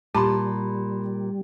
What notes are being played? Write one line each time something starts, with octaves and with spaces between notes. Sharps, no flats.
A#2 G3 G4 A5 B5 C6